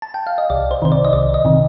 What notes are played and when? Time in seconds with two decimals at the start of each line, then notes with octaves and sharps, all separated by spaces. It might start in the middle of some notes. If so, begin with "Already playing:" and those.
0.02 A5
0.14 G5
0.27 F5
0.38 D#5
0.50 C2 D5
0.71 C5
0.82 C3 D#3 C5
0.92 D5
1.05 D#5
1.13 C2 D5
1.34 D#5
1.45 C3 D#3